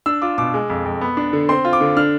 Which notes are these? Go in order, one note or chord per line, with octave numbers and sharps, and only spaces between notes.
D4 E6
F4 D6
B2 D6
G#3
F2
F2
B3
D4
D3
C4 C6
F4
D6
D3
D4 F6